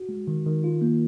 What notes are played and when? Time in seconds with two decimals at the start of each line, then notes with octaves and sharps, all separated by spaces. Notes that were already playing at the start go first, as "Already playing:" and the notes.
Already playing: F#4
0.09 G#3
0.28 D#3
0.46 D#3
0.64 F4
0.82 A#3